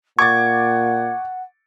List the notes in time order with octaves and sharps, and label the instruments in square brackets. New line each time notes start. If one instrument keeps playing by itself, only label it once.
[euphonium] A#2 [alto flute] F#5 [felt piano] C#6 D6 A6 [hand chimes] G#6